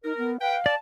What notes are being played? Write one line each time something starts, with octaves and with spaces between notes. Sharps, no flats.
D#4 A#4
B3
B4 F5 G5
D5 A5